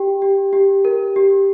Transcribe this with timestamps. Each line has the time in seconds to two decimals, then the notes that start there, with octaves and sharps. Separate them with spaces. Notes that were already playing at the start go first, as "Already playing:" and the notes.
Already playing: G4 G5
0.22 G4
0.53 G4
0.85 A#4
1.16 G4